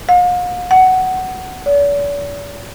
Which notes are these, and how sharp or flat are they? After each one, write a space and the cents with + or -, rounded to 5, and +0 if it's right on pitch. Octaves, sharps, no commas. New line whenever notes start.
F5 +45
F#5 +10
D5 -45